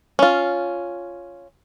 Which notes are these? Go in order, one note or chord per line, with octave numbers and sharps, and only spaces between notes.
C#4 F4